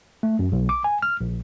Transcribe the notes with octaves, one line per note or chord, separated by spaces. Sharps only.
A3
F#2
B1
D6
G#5
F6
A#1